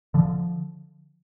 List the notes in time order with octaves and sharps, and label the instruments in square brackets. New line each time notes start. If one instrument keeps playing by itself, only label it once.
[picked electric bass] D3 F3